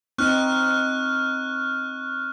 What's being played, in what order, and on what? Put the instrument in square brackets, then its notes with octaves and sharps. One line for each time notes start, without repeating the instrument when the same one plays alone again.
[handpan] C4 D#4 [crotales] C#6 F6 F#6